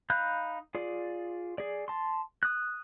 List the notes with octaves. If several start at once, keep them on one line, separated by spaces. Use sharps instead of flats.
D#4 F5 B5 F#6 G6
F4 G#4 D5
G#4 D5
A5 C6
D#6 F#6